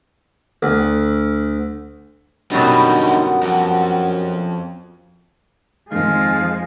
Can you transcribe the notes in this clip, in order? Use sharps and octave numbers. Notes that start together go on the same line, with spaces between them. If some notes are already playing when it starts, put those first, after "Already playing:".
D2
F#2 B2 D3 F#3 G3 D#4 F#5
F2
F2 D#3 F3 G#3 F5